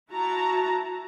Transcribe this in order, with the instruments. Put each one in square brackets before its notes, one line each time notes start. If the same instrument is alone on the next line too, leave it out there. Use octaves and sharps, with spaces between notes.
[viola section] E4 F#4 A5 A#5